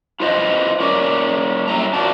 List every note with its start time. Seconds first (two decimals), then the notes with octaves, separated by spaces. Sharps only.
0.20 E4 F4 B4 C5 D#5 F5
0.80 A#3 C#4 D5
1.68 F#2 G3 E4 A#5
1.93 A#3 C4 F4 F#4 D5 A5